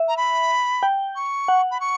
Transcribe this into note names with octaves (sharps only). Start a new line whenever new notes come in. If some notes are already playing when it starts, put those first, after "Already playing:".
Already playing: E5
A#5
B5
G5
C#6
F#5
B5
C#6